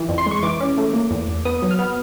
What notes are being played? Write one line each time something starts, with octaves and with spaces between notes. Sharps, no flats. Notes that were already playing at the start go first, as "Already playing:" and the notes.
Already playing: E3
F2
C6
G#3 C#6
E3 D6
C#4
A3
A#3
E2
E2
B3 D#6
F#3
F6
B3